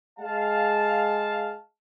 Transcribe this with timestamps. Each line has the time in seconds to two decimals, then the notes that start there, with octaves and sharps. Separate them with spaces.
0.19 G#3 F5 A5